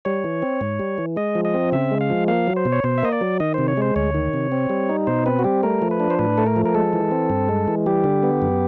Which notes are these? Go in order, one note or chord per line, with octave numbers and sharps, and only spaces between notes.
G3 C#5
E3
C4
G#2
G3
E3
G#3 D#5
F3
D#5
C4
C#3 E5
G#3
F5
F3
A#3 F5
F#3
C5
B2
C#5
B2 C5
E5
A#3 D#5
D5
F#3
D#3 D#5
C3 C5
C#5
G#3 C5
D2 C#5
D#3
C3
C4
G3
D#4
B2 C5
C4 B4
F#4
G3 G4
A3 A#4
F3
B4
D4
C5
A2 B4
A3 A4
A#4
F3
A#4
G#3 A4
E3
C4
G2
G#3
E3
G3 G4
D3
B3
F#2